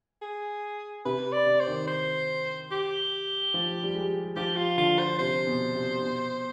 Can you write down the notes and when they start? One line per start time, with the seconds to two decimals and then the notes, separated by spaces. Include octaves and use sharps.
0.22 G#4
1.05 C3 B4
1.32 D5
1.46 C3
1.60 C5
1.67 D#3
1.88 C5
2.71 G4
3.54 F3
3.83 G3
3.95 G#3
4.36 F3 G4
4.57 F4
4.77 D3 F4
4.99 C5
5.19 C3 C5
5.47 B2
5.75 C3
6.02 B2